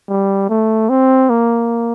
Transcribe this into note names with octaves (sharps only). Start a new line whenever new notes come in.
G3
A3
C4
A#3